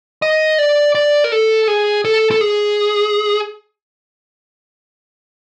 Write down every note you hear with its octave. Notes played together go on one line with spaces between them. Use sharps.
D#5
D5
D5
A#4
A4
G#4
A4
A4
G#4